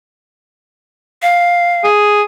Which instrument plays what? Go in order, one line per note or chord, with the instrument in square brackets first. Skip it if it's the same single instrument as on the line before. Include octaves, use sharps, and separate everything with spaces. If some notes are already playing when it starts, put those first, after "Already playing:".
[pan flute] F5
[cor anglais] G#4